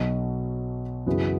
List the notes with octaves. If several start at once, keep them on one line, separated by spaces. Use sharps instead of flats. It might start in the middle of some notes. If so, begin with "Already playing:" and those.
Already playing: B1 B2 F#3
F#2 C#3 E3 B3 F#4